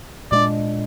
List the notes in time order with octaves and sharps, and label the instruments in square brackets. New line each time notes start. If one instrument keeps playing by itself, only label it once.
[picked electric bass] A#2 G#3 D4 [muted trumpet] D5